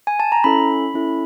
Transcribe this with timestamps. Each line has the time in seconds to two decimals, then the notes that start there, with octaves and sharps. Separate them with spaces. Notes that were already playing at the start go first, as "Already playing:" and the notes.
0.07 G#5
0.20 A5
0.32 A#5
0.44 C#4 E4 A4 B5
0.94 C#4 E4 A4